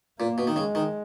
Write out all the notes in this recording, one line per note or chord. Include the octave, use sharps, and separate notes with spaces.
A#2 A#3
B2
D#3
C#3 G#3
D#3